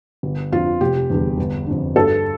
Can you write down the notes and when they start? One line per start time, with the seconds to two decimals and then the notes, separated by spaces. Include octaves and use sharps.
0.23 G1
0.52 F2 D3 F4
0.81 F1 G4
1.10 E2 D3 G3
1.38 G1
1.66 F2 D3
1.96 G2 A4